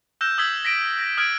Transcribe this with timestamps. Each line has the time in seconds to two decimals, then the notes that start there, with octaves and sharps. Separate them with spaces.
0.21 E6 F#6 G6 A#6 E7
0.38 D#6 E6 G#6 B6 F#7
0.65 A#6 B6 D7
0.99 A#6
1.18 D#6 F6 G#6 D7